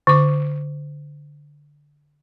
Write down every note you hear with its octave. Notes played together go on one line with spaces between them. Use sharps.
D3 D6